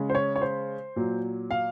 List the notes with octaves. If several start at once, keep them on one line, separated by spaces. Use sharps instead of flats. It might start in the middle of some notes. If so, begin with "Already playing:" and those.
Already playing: C#3 G#3
C5
C#5
C#5
C5
A#2 F#3
F5